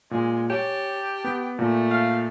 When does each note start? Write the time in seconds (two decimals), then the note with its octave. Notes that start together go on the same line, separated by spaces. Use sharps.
0.11 A#2 G#3
0.50 G4 C#5 A5
1.24 B3
1.59 A#2 A3 A4
1.91 F5